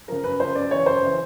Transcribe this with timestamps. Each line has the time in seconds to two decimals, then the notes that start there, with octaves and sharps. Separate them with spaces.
0.08 C#3 F3 A#4
0.24 F#2 B4
0.40 C#3 F3 C5
0.55 F#2 D5
0.71 C#3 E3 C#5
0.86 F#2 C5
1.02 C#3 E3